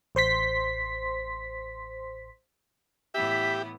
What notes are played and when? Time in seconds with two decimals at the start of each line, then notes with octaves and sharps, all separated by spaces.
0.15 A1 C5 C6 B6
3.14 A2 E3 B3 G4 E5 B6